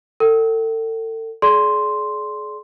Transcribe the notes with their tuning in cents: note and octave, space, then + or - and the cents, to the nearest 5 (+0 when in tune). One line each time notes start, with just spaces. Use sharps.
A4 +35 G5 -40
G#4 +35 D5 -20 C6 +0